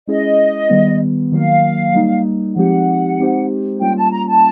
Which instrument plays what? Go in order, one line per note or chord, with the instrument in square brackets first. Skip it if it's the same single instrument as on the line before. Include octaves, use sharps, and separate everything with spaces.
[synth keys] G#3 C#4 E4 G#4 [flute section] D#5
[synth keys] D#3 G3 B3
[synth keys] D#3 F#3 A#3 [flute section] F5
[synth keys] G3 A#3 D#4
[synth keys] F3 G#3 C4 D#4 G4 [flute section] F#5
[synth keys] G#3 C4 D#4 G4 C5
[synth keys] G3 A#3 C#4 F4 [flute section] G5
[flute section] A5
A#5
A5